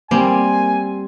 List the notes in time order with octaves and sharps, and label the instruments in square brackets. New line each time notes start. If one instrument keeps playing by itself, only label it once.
[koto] G3 [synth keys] A#3 [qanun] C4 [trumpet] G#5